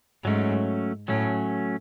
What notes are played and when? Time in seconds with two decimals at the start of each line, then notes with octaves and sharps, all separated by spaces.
0.25 G#2 F#3 A3 C#4
1.08 A2 F#3 A3 C#4